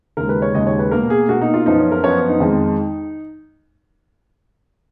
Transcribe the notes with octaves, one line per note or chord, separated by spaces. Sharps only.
D#2 C#3 G#3 A#4
B4
C#5
D#2 C#3 G#3 D#5
C#5
B4
B2 A#3 A#4
G#4
B2 A#3 F#4
D#4
F4
F#2 F3 B3 D#4
C#4
A#4
F#2 F3 B3 C#5
D#4
F2 D#3 G#3